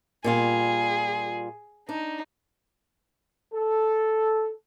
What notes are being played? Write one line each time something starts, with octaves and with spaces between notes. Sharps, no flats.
A#2 G3 F4 G#4
D4 D#4
A4